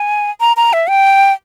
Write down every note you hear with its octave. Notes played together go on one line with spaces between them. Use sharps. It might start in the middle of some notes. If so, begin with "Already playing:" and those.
Already playing: G#5
A#5
A#5
E5
G5